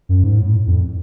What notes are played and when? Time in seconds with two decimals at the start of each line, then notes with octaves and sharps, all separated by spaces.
0.09 F#2
0.24 G#2
0.38 A2
0.67 F2